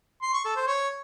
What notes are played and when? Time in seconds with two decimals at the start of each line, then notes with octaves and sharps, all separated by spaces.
0.22 C6
0.34 C#6
0.45 A4
0.56 C5
0.67 C#5